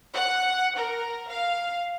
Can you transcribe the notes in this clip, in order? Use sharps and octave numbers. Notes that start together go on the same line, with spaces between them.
F#5
A#4
F5